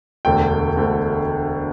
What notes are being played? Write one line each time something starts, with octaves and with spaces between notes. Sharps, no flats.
E1 D2 D3 G5
E1 D2 D3